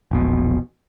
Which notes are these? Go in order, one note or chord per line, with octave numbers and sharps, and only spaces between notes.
E1 A#1 B2